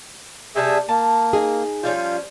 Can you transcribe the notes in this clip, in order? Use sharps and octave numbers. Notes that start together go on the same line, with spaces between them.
C3 G3 G#4 E5 A5
A#3 A5
D#4 G#4
F3 G3 C#4 F4